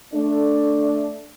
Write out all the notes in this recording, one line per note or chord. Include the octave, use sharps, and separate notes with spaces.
A3 D4